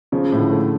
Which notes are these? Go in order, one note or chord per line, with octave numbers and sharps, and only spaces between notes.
C#3 F3
A2
D3
A3